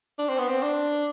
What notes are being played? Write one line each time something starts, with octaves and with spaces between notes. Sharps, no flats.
D4
C4
B3
C4
D4